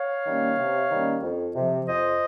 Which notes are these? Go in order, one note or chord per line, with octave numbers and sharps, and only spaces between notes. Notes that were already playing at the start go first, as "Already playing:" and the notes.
Already playing: C#5 F5
D#3 G3 A#3 C#4
C3
D#3 G3 A#3 C#4
F2
C3 F3
F2 C5 D#5